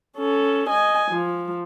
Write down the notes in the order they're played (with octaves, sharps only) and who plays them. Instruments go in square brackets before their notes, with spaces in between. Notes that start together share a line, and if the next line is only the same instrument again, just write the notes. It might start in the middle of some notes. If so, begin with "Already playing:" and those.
[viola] C#4 A4
D#5 G#5
F3